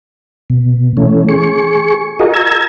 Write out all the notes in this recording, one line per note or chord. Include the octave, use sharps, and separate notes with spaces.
B2
E3 A3 C#4
G#4 C#6
F4 F#4 G#4 A#4 D#5
A#5 E6 G#6